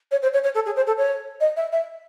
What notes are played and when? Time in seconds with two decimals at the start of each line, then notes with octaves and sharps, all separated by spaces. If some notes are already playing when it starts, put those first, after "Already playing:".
0.11 C#5
0.22 C5
0.33 C#5
0.43 C#5
0.55 A4
0.66 G#4
0.76 C5
0.87 A4
0.98 C#5
1.40 D#5
1.56 E5
1.72 E5